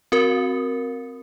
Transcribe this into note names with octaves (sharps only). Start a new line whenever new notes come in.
C4 F#4 A#4